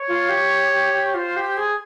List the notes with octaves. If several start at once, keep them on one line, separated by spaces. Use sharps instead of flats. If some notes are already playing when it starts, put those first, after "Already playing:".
Already playing: C#5
F4
G4
G4
G4
F4 C5
G4
G#4